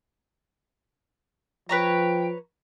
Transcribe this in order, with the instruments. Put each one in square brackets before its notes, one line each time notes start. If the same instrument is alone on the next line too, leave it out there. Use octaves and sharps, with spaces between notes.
[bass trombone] F3 [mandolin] B4 C#5 A#5 [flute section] G5